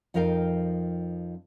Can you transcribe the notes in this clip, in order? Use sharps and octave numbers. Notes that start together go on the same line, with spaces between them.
F2 F3 D#4 A#4 F5 G5